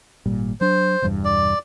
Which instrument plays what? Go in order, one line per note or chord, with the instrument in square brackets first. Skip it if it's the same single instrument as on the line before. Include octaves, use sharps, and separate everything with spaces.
[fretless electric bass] G#1 A#2 G3
[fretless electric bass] F#3 D4 [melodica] C5
[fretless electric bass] E1 E2 G2
[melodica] D5